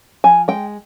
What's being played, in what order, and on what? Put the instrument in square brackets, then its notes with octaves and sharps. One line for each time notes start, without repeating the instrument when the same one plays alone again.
[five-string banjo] F3 G#5
G#3 G5